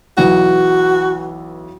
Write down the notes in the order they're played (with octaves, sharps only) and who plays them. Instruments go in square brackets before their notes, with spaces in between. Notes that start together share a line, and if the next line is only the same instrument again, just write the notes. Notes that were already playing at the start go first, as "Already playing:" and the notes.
[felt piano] B1 E3 [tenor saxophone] F#4